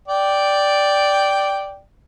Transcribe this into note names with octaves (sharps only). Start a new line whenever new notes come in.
D5 G5